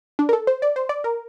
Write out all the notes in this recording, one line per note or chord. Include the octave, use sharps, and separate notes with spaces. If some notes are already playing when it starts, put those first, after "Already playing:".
D4
A#4
A4
C5
D5
C5
D5
A#4